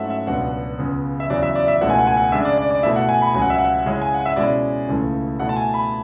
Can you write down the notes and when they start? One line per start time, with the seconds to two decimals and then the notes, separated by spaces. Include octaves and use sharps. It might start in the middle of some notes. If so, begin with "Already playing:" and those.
Already playing: G#2 F#3 A3 C#4 E4 E5 F#5
0.10 E5
0.27 C#2 B2 F#3 B3 D4 F#5
0.78 C#2 C#3 G#3 B3
1.20 E5
1.30 E2 C#3 F#3 D5
1.43 E5
1.55 D5
1.68 E5
1.81 C#2 B2 A3 E4 F#5
1.90 G#5
1.98 F#5
2.07 G#5
2.17 F#5
2.32 C#3 G#3 D4 E5
2.45 D5
2.58 D5
2.71 D5
2.83 B2 A3 E4 E5
2.96 F#5
3.09 G#5
3.22 B5
3.34 C#2 C#3 F#3 G#5
3.42 F#5
3.50 E5
3.58 F#5
3.86 C#3 G#3 C#4 E4
4.02 G#5
4.14 F#5
4.26 E5
4.36 B2 G#3 C#4 E4 D5
4.88 C#2 C#3 E3 A3
5.40 B2 A3 E4 F#5
5.49 A5
5.56 G#5
5.74 B5